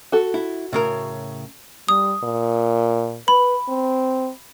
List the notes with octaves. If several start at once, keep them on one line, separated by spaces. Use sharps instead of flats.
F#4 A4
E4
A2 C#3 A#4
G3 D#6
A#2
B4 B5
C4